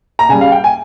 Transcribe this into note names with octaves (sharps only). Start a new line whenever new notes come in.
A#5
C#3 G3 G#5
F5
G5
G#5